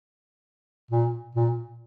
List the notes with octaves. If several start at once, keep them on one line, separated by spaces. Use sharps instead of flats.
A#2
A#2